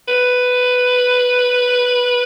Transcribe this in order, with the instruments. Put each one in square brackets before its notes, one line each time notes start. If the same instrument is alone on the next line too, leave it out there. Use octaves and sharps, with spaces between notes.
[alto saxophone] B4